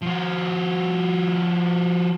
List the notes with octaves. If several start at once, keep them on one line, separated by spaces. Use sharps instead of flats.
F3 F#4